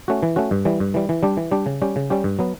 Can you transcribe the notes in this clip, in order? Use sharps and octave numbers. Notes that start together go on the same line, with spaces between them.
A3 C#4 F#4
E3
A3 C#4 F#4
G2
E3 G3
G2
E3 G3
E3
G3 D4 G4
E3
G3 D4 G4
C#3
G3 C#4 G4
C#3
G3 C#4 G4
G2
F#3 B3